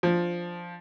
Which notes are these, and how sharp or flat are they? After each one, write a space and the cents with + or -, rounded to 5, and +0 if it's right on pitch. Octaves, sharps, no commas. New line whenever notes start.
F3 +0 D4 +0